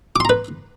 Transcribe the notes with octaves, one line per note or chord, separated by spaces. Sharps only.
B4 A#5 C6 D6